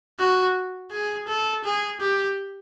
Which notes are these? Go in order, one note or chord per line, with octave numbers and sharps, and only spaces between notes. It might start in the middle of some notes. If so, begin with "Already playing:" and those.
F#4
G#4
A4
G#4
G4